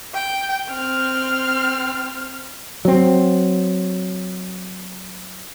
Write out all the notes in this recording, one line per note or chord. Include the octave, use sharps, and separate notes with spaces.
G5
C4 F6
F#3 C4